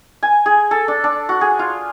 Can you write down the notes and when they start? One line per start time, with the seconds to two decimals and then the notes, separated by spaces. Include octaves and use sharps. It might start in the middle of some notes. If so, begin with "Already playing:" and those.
0.23 G#5
0.46 G#4
0.71 A4
0.88 D4
1.04 D4
1.29 F#4
1.41 G#4
1.59 F4